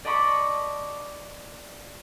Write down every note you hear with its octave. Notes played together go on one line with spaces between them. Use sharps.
D5 D#5 A5 B5 C#6 D6